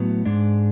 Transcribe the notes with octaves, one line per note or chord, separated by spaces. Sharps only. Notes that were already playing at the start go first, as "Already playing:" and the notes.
Already playing: A2 F#3 B3
G#2 G#3 D4